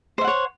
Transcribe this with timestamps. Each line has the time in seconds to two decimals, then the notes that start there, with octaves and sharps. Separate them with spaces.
0.18 C5
0.21 E5
0.24 F#5
0.27 C#5